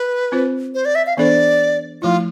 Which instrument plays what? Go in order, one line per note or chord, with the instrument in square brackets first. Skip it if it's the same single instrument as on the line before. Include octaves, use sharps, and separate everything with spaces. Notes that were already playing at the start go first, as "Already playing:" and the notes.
Already playing: [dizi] B4
[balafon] C4 F4 C5
[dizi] C5
D5
E5
F5
[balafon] E3 B3 D4 A4 C5 [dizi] D5
[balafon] F3 A3 E4 [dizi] F4